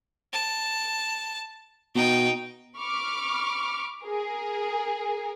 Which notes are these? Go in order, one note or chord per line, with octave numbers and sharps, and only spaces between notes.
A5
B2 D#4 G5
B5 C#6 D6 F6
G#4 A#4